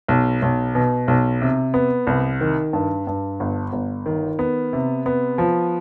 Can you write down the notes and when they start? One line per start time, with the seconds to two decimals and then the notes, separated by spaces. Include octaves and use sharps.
0.08 B1
0.42 B1
0.75 B2
1.08 B1
1.41 C3
1.74 B3
2.07 C2
2.41 D#3
2.73 G2
3.07 G2
3.40 G1
3.73 G1
4.06 D#3
4.39 B3
4.73 C3
5.06 B3
5.38 F3